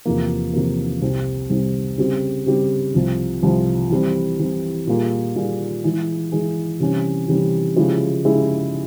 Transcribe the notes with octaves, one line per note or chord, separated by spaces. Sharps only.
E2 C3 F3 A#3
E2 C3 F3 A#3
C2 C3 G3 C4
C2 C3 G3 C4
C#3 G3 C4 G4
C#3 G3 C4 G4
C2 C3 F3
C2 C3 F3
E3 G3 C4
E3 G3 C4
A#2 G3 A#3 F4 G#4
A#2 G3 A#3 F4 G#4
E3 G#3 E4 G#4
E3 G#3 E4 G#4
C3 E3 G3 C#4
C3 E3 G3 C#4
C#3 F3 G#3 E4 G4
C#3 F3 G#3 E4 G4